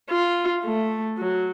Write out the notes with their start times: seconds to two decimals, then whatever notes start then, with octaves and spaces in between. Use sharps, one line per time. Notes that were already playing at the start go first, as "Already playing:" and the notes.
0.10 F4
0.65 A3
1.19 F#3